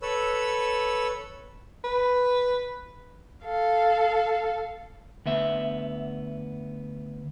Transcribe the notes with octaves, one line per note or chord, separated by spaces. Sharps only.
A4 B4 C#5 E6
B4
A4 F5
D2 B3 E5